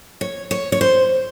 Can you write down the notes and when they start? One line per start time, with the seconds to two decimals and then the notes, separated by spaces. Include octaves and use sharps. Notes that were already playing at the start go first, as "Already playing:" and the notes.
0.21 C#5
0.51 C#5
0.72 C#5
0.81 C5